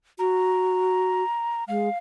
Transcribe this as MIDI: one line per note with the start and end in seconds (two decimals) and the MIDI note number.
0.19 1.23 66
0.19 1.64 82
1.68 1.89 56
1.68 1.98 77